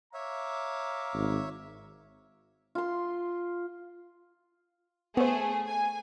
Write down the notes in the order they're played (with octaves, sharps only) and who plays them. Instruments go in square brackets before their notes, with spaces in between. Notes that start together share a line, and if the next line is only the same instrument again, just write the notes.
[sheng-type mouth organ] C#5 E5 [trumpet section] F5 A#5 D6
[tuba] G#1
[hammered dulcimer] F4 C6
[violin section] A3 G#4 [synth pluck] B3 C5
[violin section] G#5